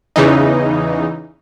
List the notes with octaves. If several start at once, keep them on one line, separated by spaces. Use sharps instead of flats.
E2 C#3 E3 D#4